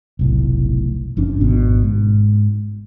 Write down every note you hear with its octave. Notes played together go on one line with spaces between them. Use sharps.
F1 B1 A2
F#1 F2 C#4 D4
G#1 B2
G#2